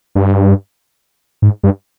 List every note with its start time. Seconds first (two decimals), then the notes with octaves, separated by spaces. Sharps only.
0.15 G2
1.42 G#2
1.63 G2